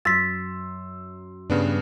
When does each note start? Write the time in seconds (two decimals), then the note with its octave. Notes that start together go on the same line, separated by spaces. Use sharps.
0.05 F#2 C6 E6 A6 B6
1.50 G2 C#3 B3 D4